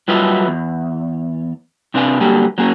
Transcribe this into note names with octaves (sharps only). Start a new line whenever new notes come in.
F#3 G3 F4 B4 D#5 E5
E2
C3 C4 D4 B4 F5 G#5
D3 F#3 G3 A#3 G4 G#5
F#3 A#3 C#4 G#4